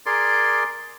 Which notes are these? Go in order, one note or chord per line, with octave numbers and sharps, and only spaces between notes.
G#4 A#4 D5 C6 D6